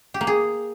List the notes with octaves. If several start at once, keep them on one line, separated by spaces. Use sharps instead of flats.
G4
A#3
G#4